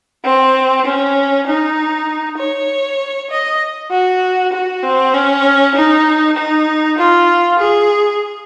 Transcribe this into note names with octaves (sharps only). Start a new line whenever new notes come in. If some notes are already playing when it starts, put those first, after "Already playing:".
C4
C#4
D#4
C#5
D#5
F#4
F#4
C4
C#4
D#4
D#4
F4
G#4